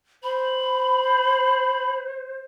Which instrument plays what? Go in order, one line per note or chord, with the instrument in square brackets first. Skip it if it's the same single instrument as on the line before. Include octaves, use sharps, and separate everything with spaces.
[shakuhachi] C5 [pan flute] B5